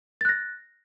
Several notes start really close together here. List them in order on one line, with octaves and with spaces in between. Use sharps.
A6 F#6 A#6